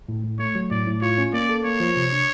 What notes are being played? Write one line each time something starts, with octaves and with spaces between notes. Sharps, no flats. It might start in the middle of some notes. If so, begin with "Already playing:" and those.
A2
A2
A3 C#5
F#3
A2 D5
A2
F4 C#5
C#4
A#3 D5
A4
A#3 C#5
F3
C3
D4